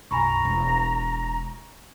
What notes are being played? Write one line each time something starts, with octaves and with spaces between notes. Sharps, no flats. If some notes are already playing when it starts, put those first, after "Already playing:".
B1 F#2 G#5 A#5 B5 C#6
E1